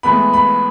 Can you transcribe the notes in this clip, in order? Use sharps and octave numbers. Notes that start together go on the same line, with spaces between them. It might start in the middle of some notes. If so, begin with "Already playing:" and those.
A2 E3 G#3 B3 B5
B5